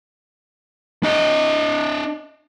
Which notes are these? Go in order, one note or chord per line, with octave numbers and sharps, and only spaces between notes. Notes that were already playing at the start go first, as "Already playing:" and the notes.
D4 D#5